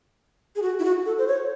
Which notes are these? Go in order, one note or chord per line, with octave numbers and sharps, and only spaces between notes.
G#4
F#4
E4
F#4
A4
C5
C#5